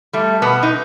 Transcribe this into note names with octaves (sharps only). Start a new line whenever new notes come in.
G3 A3
B2 B3
D#4